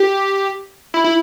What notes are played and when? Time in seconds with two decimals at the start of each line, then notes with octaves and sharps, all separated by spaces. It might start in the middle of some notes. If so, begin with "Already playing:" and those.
Already playing: G4
0.94 E4
1.04 E4